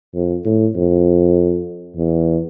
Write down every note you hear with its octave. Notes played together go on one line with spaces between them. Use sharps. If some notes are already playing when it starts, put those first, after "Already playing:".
F2
A2
F2
E2